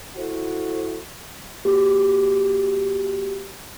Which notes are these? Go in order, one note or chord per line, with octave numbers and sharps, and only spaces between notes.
E4 F#4 A4 C5
A#3 F#4 G4